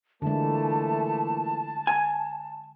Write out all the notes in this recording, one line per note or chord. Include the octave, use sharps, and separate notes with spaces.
A#2 D3 E3 G#3 A3 A5
G#5